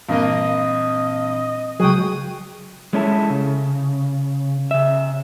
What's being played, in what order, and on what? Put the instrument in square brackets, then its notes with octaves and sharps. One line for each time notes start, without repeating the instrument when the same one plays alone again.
[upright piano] G2 A#3 [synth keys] A#2 E3 C4 [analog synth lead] D#5
[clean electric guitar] C#2 F#3 [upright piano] G#4 G5 [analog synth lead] D#6
[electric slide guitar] G#3 C#4 E4 A4
C#3
C#3 E5